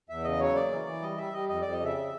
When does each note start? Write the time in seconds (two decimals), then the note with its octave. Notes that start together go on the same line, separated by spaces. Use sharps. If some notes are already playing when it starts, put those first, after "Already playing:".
0.09 E2 E5
0.24 C#3 D#5
0.40 F#3 C#5
0.55 A#3 D5
0.72 E3
0.87 E3
1.02 G3 D#5
1.17 G3 E5
1.33 G3 D#5
1.49 F2 D#5
1.61 F2 D5
1.72 D#5
1.80 C#3 E5